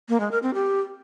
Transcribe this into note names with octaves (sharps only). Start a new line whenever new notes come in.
A#3
G#3
A#4
C4
G4